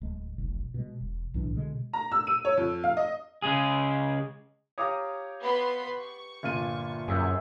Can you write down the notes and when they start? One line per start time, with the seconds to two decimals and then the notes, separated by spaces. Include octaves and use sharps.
0.01 D1 G#3
0.38 F1 B1
0.74 B2 G#3
1.01 E1
1.34 B1 A2 E3 D4
1.54 B2 D3 G#3
1.93 A#5
2.12 E6
2.27 D#7
2.45 C#5
2.57 F2
2.84 F5
2.97 D#5
3.42 C#3 G#3 G#4
4.78 G4 C#5 F5 A#5 D6 D#6
5.43 B3 B5 C6
5.99 C#6
6.43 G1 A#2 F4 D#7
7.08 F#2 G#4 E5 G5